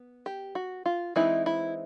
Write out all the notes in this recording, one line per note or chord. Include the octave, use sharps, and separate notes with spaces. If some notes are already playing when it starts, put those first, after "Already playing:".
Already playing: B3
G4
F#4
F4
E3 G#3 C4 D#4 E4
E4